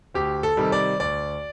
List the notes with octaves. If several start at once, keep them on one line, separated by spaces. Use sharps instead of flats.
D2 G4
A4
C3 D#3 G3
D5
D2 D5